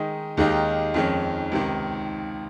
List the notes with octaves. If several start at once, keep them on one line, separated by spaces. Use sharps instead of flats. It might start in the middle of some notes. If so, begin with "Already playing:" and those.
Already playing: D#3 G#3 D#4
D#2 D#3 G#3 D#4 G4
F2 D#3 G#3 C#4
C#2 C3 D#3